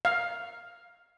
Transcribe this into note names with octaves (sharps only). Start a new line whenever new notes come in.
F5